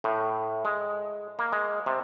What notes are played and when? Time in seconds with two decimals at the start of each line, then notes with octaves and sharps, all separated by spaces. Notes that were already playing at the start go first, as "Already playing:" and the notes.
0.04 A2
0.65 G#3
1.39 A#3
1.52 G#3
1.86 C3